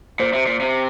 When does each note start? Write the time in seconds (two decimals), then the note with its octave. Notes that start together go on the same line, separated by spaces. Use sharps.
0.20 A#2 C5
0.33 C3
0.46 A#2
0.60 C3